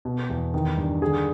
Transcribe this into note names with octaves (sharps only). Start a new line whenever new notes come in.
B2
E2
D#3
G2
D3 G#4